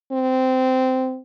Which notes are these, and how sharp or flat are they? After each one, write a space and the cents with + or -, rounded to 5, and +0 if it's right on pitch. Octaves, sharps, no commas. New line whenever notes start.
C4 -15